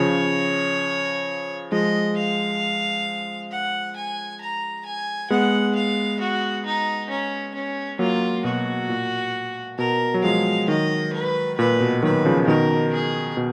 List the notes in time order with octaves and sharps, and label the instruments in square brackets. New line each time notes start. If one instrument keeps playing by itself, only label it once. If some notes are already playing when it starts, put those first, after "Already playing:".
Already playing: [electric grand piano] C#3 F3 [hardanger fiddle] C#5
[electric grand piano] F3 G#3 [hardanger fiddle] D#5
[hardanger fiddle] F5
F#5
G#5
A#5
G#5
[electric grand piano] G#3 B3 [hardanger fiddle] F#5
[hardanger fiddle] F5
F#4
D#4
C#4
C#4
[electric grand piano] F#3 A#3 [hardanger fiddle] F4
[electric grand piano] B2 [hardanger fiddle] F#4
[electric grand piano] A#2
[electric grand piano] B2 [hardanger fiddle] A#4
[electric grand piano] F#3
[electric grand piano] F3 G#3 [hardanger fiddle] F5
[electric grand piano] D#3 F#3 [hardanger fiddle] D#5
[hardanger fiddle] B4
[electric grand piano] A#2 [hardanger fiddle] B4
[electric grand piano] B2
[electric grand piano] D#3 F#3 [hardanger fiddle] B4
[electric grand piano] C#3 F3
[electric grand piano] B2 D#3 [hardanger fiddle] A#4
[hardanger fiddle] G#4
[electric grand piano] B2